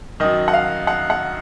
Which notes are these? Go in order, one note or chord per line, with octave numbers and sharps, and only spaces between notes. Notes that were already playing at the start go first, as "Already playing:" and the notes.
F#2 D#3 D#5
F#5
F5
F#5
F#5